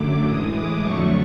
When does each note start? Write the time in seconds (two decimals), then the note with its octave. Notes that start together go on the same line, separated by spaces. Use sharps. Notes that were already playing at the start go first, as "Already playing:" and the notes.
Already playing: F#2 D3 F#3 A3 D6
0.26 A2 E3 G#3 D#6
0.54 D6
0.82 F2 D3 F#3 A3 C#6